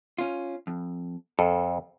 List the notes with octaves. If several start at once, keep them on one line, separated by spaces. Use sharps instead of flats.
C#4 F4
F2
F2 A4